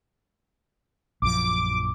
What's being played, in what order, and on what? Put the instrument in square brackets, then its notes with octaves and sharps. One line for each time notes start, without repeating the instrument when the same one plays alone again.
[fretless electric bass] A#1 F#2 F3 [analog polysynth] D6